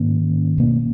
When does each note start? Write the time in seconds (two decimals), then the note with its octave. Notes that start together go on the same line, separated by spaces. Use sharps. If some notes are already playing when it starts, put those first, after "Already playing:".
Already playing: G#2 D#3 A#3 C#4
0.58 B2 A#3 C#4